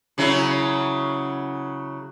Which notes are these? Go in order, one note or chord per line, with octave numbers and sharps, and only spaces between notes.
C#3 F#3 E4